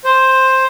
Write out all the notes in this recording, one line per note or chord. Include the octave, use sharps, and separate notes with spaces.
C5